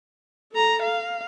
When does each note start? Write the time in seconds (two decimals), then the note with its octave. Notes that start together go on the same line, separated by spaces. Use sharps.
0.52 A4 A#5
0.83 F5